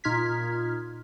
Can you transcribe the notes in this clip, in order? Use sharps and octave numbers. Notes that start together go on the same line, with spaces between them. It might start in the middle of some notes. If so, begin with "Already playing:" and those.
A#2 D#4 F4 F6 G#6 B6